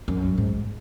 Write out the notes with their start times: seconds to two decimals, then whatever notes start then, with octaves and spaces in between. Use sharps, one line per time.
0.08 F#2
0.38 G#2